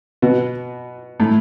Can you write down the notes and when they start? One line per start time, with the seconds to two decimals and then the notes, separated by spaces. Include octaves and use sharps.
0.22 B2 B3
1.20 A2 A3